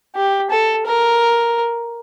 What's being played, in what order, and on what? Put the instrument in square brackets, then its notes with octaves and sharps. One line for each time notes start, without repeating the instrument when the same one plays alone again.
[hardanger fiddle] G4
A4
A#4